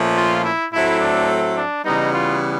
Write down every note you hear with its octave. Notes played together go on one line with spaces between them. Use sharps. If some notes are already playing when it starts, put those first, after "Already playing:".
Already playing: A#2 F3 A3 C#4
F4
E4
A2 F#3 A3 C4 E4
D4
D4
C#3 E3 G3 B3 D#4
F4